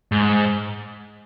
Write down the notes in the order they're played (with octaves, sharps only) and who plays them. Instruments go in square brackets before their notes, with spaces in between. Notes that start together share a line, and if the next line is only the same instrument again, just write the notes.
[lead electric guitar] G#2